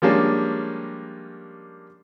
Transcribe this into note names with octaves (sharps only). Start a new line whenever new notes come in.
F3 G3 G#3 A#3 C#4 D4